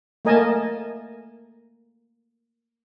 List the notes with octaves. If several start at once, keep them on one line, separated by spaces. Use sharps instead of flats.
A3 A#3 A#4 D#5 G#5 A5